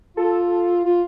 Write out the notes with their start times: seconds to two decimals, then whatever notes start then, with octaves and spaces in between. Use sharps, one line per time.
0.17 F4 A4
0.85 F4